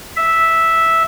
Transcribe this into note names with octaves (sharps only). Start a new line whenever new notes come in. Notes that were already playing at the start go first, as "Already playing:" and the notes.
E5